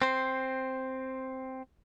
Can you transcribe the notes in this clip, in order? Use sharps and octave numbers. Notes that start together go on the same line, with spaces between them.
C4 C5